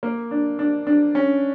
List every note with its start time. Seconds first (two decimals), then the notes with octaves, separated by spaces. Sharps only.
0.03 A#3
0.31 D4
0.59 D4
0.87 D4
1.15 C#4